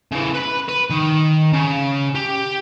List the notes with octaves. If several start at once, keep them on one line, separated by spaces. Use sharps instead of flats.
C#3 E3
B4 B5
B4
D#3
C#3
G4